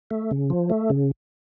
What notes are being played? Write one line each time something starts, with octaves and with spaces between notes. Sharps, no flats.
A3
C#3
F3
A3
C#3